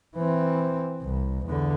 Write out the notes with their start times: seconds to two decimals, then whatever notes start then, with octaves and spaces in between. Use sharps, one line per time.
0.15 E3 C4
1.02 C2
1.45 E2 D3